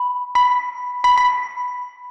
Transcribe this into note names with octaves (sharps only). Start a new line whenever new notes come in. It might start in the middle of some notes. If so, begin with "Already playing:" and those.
Already playing: B5
B5
B5
B5